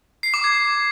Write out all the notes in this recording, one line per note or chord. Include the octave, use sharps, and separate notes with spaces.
C7
D6
G#6